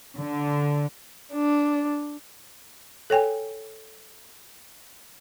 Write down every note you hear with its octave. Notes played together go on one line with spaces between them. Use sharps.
D3
D4
A4 C#5 G5 G#5